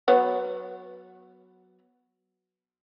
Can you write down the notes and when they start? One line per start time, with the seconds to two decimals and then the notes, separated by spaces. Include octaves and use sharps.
0.08 F#3 B3 C#5